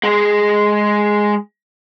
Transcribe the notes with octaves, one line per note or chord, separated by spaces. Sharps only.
G#3 G#4